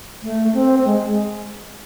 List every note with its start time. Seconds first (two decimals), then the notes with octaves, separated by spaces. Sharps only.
0.23 A3
0.53 C4
0.84 G#3